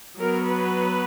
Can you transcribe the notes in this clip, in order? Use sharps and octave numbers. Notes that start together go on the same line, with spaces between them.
F#3 B3 A#4
B4